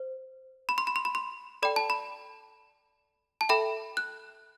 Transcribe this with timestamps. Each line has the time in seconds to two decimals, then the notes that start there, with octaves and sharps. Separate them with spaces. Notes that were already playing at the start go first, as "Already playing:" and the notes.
Already playing: C5
0.69 B5
0.78 C6
0.87 B5
0.96 C6
1.05 B5
1.15 C6
1.62 A4 D5 G5 B5
1.76 A5
1.90 B5
3.41 A5
3.49 A4 E5 G5 B5
3.97 F#6